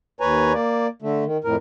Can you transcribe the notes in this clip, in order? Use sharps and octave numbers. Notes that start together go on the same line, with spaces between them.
D#2 B4 C#5 G#5 A#5
A#3 D5
D3 A3
D#3
F2 A2 A#4